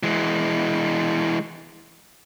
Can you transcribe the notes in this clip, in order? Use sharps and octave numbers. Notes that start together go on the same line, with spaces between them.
E3 G#3